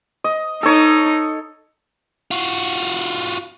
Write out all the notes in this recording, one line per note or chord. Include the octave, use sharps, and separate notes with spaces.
D#5
D#4 A4 C#5
F4 F#4